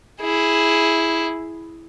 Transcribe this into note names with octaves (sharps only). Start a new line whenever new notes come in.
E4 G#4